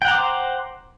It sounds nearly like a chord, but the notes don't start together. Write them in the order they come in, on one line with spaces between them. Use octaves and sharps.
G5 F#5 A#5 D6 C5